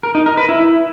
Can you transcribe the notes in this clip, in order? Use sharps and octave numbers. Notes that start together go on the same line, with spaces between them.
A#4
D#4
A#4
B4
E4